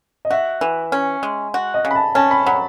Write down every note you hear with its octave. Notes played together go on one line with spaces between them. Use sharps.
D#5
F#4 E5
E3
C#4
G#3
F#4
D#5
C#3
B5
A5
C#4 A5
B5
F#3 B5